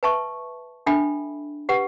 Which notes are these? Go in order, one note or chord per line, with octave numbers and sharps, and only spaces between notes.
B4 E5 A5 C#6
D4 A4 E5 G5 B5
G4 B4 F#5